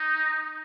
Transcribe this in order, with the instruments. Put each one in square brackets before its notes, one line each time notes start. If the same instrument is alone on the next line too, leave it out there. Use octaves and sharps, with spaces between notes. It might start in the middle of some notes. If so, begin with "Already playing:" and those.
Already playing: [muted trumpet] D#4